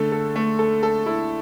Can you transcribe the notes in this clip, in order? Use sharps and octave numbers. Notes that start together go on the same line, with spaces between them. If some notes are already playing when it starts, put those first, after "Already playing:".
Already playing: D3 A3 A4
A4
A3
A4
A4
E4